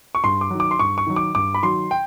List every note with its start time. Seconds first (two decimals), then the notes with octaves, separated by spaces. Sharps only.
0.15 C#6
0.24 G2 C6
0.41 D6
0.51 D#3 F#3
0.60 D6
0.71 C6
0.79 G2 C#6
0.98 C#6
1.07 D#3 F#3
1.16 D6
1.35 G2 D6
1.54 B5
1.63 D#3 F#3 C6
1.91 G5